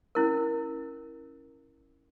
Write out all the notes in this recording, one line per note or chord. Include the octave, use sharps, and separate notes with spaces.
C#4 E4 A#4